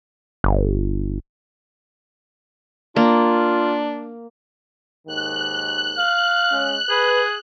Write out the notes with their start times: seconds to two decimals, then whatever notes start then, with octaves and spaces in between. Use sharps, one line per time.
0.44 G1
2.96 A#3 D4 F4
5.07 D#2 G#2 D#3 F#6
5.98 F5
6.52 G#3 C#4
6.90 G#4 B4